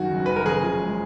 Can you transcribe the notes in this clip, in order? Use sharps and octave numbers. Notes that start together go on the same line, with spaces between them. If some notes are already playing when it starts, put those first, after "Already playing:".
Already playing: F#2 D#3 F#4
F#1
F#1 B4
A#4
C#3 G#4
F3
G#3